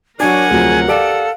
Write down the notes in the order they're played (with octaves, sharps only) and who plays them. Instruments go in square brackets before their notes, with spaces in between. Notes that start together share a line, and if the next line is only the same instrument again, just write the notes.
[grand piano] F#3 D4 [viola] A#4 F#5 [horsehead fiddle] C#5 D5 [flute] G#5
[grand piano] D2 C3 F3 [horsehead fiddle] F#3 G#4
[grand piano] G4 D5 D7 [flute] A4 [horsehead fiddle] F5